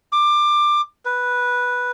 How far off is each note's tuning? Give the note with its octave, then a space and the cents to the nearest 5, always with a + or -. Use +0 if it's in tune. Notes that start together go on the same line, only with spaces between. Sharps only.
D6 +20
B4 -5